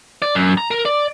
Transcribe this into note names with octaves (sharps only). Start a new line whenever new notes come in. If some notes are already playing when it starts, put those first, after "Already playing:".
D5
F#2
A#5
A#4
D5